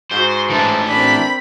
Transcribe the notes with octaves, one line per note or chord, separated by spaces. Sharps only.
G#2 F#4 C5
E3 A3 D4 A5
A#3 C4 D4 B5